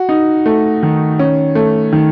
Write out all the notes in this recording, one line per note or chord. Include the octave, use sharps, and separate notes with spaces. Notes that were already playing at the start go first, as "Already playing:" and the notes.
Already playing: F#4
D#4
A3
D#3
C#4
A3
D#3